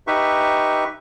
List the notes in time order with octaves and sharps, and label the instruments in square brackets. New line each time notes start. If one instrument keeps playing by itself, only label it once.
[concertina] D#4 G4 B4 E5 C#6